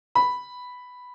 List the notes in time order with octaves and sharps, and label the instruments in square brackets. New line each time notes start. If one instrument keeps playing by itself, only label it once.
[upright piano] B5